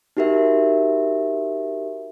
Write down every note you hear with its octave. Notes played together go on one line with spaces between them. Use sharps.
D#4 F#4 G4 A#4 E5